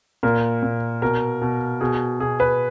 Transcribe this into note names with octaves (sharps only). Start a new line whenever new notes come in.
A#2 A#4
A#2
B2 A#4
B2
B2 G#4
B2 G#4
B4